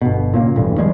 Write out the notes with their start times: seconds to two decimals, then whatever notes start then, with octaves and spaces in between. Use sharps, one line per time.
0.01 G1 B2
0.34 A#2 C#3 A#3
0.56 E1 A1 G2
0.78 D#3 F3 G3 G#3